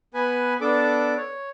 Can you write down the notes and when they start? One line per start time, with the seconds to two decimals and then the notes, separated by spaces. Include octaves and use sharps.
0.14 B3 B4 G#5
0.61 B3 D4 A4 D6
1.17 C#5